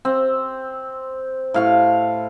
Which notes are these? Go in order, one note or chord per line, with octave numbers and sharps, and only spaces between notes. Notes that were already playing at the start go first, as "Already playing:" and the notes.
C4
A2 F5 C#6